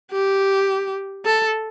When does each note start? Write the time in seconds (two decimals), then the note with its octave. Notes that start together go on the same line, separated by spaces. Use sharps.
0.12 G4
1.25 A4